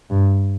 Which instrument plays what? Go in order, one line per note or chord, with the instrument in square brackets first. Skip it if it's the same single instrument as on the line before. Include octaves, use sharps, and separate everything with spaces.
[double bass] G2